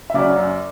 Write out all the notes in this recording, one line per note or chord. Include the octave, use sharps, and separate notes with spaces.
E5
C#3 F#3 C#4 D5
F#2